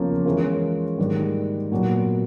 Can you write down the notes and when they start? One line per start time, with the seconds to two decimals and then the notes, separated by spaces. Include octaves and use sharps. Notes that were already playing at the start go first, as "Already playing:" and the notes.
Already playing: E2 C#3 F3 A#3 C#4
0.25 E3 G#3 C#4 F4 A#4
0.98 G#2 D#3 G3 A#3
1.72 A#2 F#3 B3